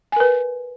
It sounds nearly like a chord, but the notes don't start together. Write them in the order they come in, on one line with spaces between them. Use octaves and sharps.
G#5 A#4 B4